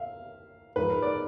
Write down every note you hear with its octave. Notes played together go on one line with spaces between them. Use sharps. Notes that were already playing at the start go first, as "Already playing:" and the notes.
Already playing: E5 F5
G#2 F3 B4
A#4
D5